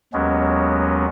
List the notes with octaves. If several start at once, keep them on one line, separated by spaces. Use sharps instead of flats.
D#2 F#3 G#3 B3 C#4